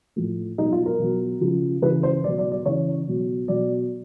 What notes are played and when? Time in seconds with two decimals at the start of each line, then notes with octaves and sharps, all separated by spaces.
0.16 A2 F3
0.58 B2 F#3 D#4
0.72 F4
0.86 A#4
0.99 B2 F#3
1.41 C#3 F3
1.82 C#3 E3 B4
2.03 C5
2.24 B2 F#3 D5
2.38 D5
2.52 D5
2.65 C#3 E3 C#5
3.08 B2 F#3
3.48 B2 F#3 D5